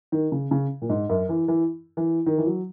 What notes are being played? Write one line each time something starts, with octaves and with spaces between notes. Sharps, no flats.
D#3
C#3
C#3
A#2
G#2
F#2
E3
E3
E3
D#3
E3
F#3